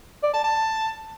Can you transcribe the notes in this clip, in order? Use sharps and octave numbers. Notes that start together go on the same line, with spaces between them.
D5
A5
A5